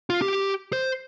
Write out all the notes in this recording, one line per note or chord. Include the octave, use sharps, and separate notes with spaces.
F4
G4
C5